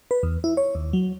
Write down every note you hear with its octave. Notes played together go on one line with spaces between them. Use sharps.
B4
E2
E4
C#5
D#2
F#3